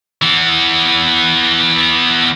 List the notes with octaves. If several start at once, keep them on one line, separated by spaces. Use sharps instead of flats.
E3 B3